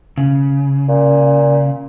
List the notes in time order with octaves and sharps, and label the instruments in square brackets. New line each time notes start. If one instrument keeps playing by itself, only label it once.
[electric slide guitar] C#3
[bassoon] A#2